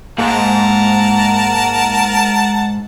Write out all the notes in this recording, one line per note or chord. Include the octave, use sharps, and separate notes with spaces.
G#2 A#3 A#4 F#5 A5